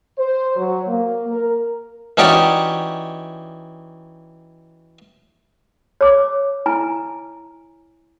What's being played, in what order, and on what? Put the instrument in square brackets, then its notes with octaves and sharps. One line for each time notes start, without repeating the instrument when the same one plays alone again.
[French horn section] C5
F#3
A#3
A#4
[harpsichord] E3 C#4 D#4 F#4 G4 D5
[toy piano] C#5 D6
E4 G#5 A#5